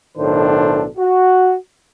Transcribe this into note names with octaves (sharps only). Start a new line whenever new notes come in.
B1 A2 D#3 D4 A4 C5
F#4